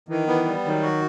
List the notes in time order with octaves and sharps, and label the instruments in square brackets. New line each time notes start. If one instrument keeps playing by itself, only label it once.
[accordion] D#3 [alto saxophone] E3
[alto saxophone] E3 [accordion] B3
[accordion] G3
[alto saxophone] D#3 [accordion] F#3
[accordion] F#4